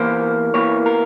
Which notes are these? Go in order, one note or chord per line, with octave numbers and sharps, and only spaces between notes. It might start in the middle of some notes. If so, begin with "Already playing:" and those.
Already playing: E2 E3 A#3 C5
E2 E3 A#3 C#5
A#4